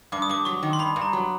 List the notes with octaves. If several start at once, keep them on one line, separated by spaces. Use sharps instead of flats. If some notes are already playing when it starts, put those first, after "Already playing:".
G2 D6
D#6
G2 D6
F#3 C#6
D#3
C6
G2 B5
G2
A#5
F#3